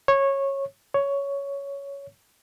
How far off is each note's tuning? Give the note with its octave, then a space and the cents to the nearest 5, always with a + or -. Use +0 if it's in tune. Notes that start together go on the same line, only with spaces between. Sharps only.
C#5 -15
C#5 +10